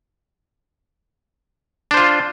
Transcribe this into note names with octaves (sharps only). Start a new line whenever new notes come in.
D4 F4 C5